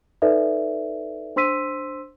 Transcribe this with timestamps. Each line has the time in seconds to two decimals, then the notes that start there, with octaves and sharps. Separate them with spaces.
0.22 D#4 A4 B4 D5 E5
1.36 D4 C5 C6 E6 B6 D#7